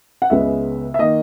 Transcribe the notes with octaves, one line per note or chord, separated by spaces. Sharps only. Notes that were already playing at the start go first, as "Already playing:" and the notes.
F#5
C#2 C#3 G#3 B3 E5
E5
D#3 A#3 D#5